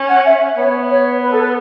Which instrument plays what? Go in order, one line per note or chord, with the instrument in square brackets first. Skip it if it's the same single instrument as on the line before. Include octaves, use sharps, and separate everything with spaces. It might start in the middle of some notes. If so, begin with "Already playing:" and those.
Already playing: [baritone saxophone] C#4
[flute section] F#5
E5
[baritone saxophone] B3 [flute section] C#5
[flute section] C#5
B4
A4
B4